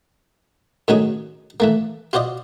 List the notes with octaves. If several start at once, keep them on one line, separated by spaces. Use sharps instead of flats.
A2 D#3 F#3 C#4 D#4 G#4
E3 A3 A#3
F4 F#4 C5 D5 D#5